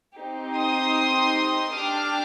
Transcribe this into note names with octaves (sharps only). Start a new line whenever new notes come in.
C4 D#4 G4
C6 D#6
D4 G4 D6 F6